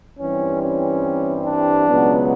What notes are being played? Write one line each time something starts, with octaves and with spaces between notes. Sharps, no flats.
G2 E3 G3 C4 C#4
C#4
D4
C#2 B2 F#3 B3